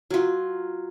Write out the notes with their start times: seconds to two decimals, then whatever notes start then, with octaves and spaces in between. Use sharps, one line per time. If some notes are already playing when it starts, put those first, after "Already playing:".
0.10 F#3 F4